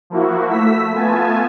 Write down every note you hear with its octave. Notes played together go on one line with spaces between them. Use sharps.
F3 A#3 E4 F#4
A3 E6 B6
A3 B3 F4 G#5 A5